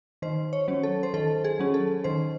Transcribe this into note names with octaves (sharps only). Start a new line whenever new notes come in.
D#3 C5
C#5
F#3 C#4
A4
C5
D#3 A4
G#4
F#3 C#4
A4
D#3 C5